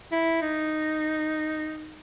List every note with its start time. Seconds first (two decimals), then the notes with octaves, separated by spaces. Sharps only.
0.12 E4
0.42 D#4